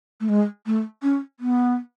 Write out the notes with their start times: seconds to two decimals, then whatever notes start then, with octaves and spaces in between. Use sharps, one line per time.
0.20 A3
0.29 G#3
0.66 A3
1.03 C#4
1.40 B3